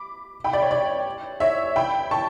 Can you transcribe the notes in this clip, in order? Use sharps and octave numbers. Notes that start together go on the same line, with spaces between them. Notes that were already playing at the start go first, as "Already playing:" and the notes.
Already playing: B5 D6
G5 B5
D5
C#5
D5
C#5 E5
G5 B5
A5 C#6